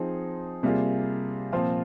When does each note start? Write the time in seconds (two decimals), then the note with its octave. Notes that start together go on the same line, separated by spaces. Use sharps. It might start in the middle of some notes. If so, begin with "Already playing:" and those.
Already playing: F3 C4 D#4 G#4
0.63 C3 G3 A#3 F4 G#4
1.52 A#2 F3 C4 F4